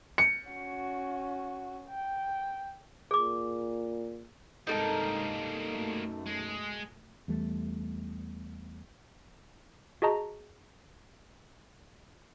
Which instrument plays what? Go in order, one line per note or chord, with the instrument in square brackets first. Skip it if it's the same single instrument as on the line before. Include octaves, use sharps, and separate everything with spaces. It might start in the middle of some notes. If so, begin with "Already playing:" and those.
[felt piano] C#7
[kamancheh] C#4 F#4
G5
[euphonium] A#2 [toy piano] G#4 D6
[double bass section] G2 C3 G#3 [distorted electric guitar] G3 A#3 [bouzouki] D#4 A4 A#4
[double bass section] F#2 B2 A3
[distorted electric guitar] G#3
[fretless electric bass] E2 G3 A3
[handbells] F#4 G#4 D#5 A5 A#5